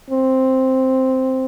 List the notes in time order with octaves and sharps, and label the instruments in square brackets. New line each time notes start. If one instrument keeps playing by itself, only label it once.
[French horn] C4